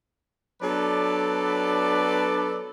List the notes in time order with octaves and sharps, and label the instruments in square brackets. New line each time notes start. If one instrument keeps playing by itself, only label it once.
[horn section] F#3 B3 D4 A4 B4 D5